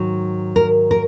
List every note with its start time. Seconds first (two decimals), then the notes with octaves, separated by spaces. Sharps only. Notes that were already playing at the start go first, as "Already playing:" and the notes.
Already playing: G#2 D#3 F#3
0.56 A#4
0.91 A#4